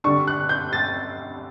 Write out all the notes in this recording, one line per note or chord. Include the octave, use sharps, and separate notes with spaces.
D3 G3 D4 C#6
F#6
G6
A6